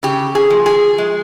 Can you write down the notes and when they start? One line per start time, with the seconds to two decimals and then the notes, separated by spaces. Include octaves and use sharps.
0.03 C#3 G4
0.35 G#4
0.50 F3
0.66 G#4
0.98 G#3